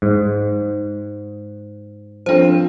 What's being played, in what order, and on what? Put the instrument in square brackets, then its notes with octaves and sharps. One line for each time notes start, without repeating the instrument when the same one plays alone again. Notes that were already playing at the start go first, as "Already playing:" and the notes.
[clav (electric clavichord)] G#2
[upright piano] F3 C4 [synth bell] D4 C5